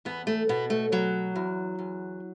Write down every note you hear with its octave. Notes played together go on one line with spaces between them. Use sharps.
E2 B3
A3
B2 B3
A3
B2 F#3
E2
E2